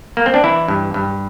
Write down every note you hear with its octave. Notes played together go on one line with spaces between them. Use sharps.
A#3
C4
D4
E3 E4
G2
G2